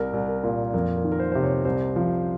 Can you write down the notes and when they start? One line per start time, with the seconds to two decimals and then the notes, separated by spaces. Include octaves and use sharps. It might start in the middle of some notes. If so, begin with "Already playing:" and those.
Already playing: C2 A#4
0.13 C2
0.28 A#4
0.44 A#2
0.74 F2 A#4
0.97 A#4
1.04 D#3
1.12 A#4
1.20 C5
1.32 C3 C5
1.43 C#5
1.65 C2 C5
1.96 F3